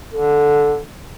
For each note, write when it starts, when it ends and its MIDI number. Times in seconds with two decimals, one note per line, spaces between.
0.14 0.80 50
0.14 0.78 69